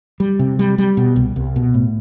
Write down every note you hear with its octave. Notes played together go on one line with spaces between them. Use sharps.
G3
C3
G3
G3
B2
C2
C2
B2
A2